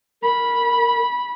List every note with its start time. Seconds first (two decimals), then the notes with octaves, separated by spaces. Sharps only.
0.23 A#4 B5